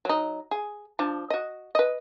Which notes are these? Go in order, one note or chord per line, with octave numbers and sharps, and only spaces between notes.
F#3 D#4
G#4
F3 D4
F#4 D#5
B4 D#5